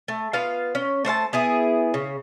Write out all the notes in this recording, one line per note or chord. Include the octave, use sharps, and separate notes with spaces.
A3
B3 F4 F5
C#4
A3 C5 F5 A5
B3 E4 G#4
C#3